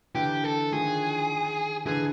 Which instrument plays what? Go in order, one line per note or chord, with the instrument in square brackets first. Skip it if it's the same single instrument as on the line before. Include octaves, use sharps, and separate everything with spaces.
[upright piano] D3 E3 [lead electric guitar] G4
[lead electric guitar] A4
[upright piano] D#3 F3 [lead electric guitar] G#4
[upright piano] D3 E3 [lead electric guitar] G#4